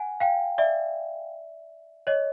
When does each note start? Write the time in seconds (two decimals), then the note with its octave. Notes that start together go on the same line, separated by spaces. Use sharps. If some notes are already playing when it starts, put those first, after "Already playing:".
Already playing: F#5 G#5
0.20 F5 G5
0.58 D5 E5
2.07 C#5 D#5